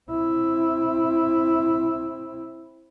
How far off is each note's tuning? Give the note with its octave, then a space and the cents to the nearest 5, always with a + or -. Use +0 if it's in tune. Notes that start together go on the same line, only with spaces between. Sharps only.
C4 +20 E4 +0